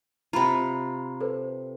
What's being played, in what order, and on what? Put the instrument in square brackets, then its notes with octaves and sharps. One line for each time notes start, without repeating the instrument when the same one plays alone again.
[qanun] C3 F4 [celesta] A#5 B5
[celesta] A4 B4 C5